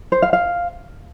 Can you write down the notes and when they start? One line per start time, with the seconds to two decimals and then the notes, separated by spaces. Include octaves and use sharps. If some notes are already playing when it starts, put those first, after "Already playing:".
0.12 C5
0.22 F5
0.33 F5